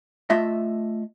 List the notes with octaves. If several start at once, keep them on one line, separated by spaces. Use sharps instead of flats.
A3 F4 D#5 E5